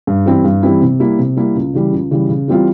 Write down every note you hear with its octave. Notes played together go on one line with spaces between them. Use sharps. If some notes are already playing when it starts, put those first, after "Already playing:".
G2
E3 G3 C4 E4
G2
E3 G3 C4 E4
C3
G3 A#3 E4
C3
G3 A#3 E4
C#2
C#3 E3 G3
C#2
C#3 E3 G3
C#3
E3 G3 C4 F4